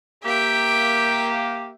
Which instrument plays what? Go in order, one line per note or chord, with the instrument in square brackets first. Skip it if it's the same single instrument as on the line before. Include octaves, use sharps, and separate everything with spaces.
[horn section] A#3 G4 [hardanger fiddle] E5 G5